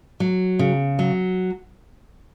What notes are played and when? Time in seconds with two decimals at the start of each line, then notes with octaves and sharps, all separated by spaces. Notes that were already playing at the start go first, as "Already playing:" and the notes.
0.20 F#3
0.59 C#3
0.99 F#3